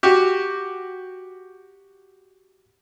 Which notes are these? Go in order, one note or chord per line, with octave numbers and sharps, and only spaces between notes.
F#4 G4